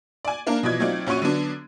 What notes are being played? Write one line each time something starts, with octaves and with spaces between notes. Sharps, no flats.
D5 G#5
A#3 D4 A#4
B2 E3 F3 D5 D#5 G#6
F#3 A3 C4 D#4 F4 D5
A#1 C#4 F#4 C#6 D#7
D3 F#3 B3 D4